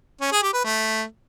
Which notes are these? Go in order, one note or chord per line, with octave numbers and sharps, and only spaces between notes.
C#4
G#4
G4
B4
A3